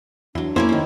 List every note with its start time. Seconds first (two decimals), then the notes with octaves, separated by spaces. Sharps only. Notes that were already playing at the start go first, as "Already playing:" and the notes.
0.35 E2 F#3 D4 C6
0.56 F2 A#3 B3 C#4 E4 C5 C#5
0.69 D#3 D#4 E4